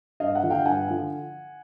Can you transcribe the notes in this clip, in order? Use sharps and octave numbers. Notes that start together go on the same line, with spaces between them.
G2 D#5 F5
E5 F#5
D3 F3
F5 G5
G2 F#5 G#5
D3 F3